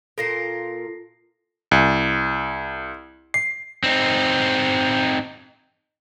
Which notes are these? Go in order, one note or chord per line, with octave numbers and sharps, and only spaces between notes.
A#2 F4 A4 A#4 A#6 C7
C2
C7
C4 D#4